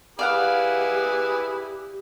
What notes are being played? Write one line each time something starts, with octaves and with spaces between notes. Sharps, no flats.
E4 G4 G#4 B4 D5 F5 F#5